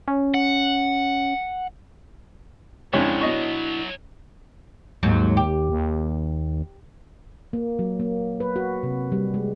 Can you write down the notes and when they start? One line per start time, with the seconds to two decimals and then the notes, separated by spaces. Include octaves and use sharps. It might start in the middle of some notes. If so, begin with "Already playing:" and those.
0.08 C#4
0.34 F#5
2.93 F2 C#3 F#3 G#3 B3 D4 E4 C#5
3.21 B2 D#5 C#6
5.03 D#2 G#2 F#3
5.37 G4
5.69 D#2
7.53 A#3
7.79 F#3
8.00 A#3
8.40 B4
8.56 F#4
8.83 C3
9.12 G3
9.34 G#3